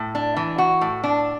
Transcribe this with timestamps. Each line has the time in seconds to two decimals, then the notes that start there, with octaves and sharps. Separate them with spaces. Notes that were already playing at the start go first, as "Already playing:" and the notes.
Already playing: A2
0.15 D4
0.37 E3
0.58 F#4
0.81 A2
1.03 D4